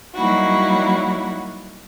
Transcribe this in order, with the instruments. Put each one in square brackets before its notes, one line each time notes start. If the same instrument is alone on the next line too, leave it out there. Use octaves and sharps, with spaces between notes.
[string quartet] F#3 G3 A#3 D#4 E4 F#4